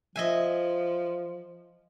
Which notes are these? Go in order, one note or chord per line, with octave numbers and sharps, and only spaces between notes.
F3 D#5 E5 G#5